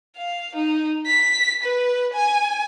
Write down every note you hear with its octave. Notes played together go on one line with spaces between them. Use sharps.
F5
D#4
B6
B4
G#5